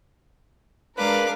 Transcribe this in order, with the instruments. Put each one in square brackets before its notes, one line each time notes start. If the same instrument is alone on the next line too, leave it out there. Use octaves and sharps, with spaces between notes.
[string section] G#3 D4 A#4 [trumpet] B4 [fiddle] F5 D6